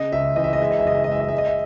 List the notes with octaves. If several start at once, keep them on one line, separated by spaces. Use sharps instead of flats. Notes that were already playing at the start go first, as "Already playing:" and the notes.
Already playing: C#3 D#5
C#2 E5
E3 D#5
E5
D#5
G#3 E5
D#5
E5
F#1 D#5
E5
D#5
G#3 E5
D#5
G#3 E5
D#5
E5